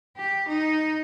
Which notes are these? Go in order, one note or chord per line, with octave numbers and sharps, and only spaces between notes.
G4
D#4